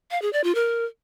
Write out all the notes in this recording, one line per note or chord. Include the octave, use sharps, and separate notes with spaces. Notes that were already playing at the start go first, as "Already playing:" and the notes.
F5
G#4
D5
F4
A#4